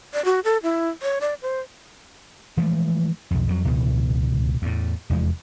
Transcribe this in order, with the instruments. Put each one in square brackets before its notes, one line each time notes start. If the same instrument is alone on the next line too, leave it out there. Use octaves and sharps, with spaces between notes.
[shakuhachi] D5
F#4
A4
E4
C#5
D5
C5
[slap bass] E3 F3 G#3 A3
B1 F2
F2 D#3 F#3
D1 C#2 B2 E3
E2 A2
F1 E2 G#3